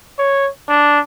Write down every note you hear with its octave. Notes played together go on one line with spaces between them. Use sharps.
C#5
D4